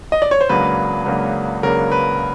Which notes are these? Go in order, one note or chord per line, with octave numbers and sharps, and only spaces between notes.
D#5
D5
C#5
C5
C#2 C#3 F#3 A#3 D4 B4
C#2 C#3 F#3 A#3 D4
C#2 C#3 F#3 A#3 D4 A#4
B4